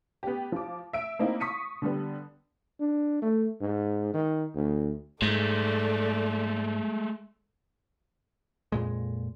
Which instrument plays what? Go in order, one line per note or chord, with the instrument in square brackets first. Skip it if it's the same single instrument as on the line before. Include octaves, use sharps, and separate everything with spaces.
[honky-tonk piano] B3 G4
F3 D6
E5 D7
A#3 C4 D#4 E4
C#6 D#6 B6 C#7 D#7
D3 G3 B3
[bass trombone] D4
A3
G#2
D#3
D2
[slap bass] G#2 [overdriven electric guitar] G#3 A3 [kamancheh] A4 D5
[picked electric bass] F2 A#2 G#3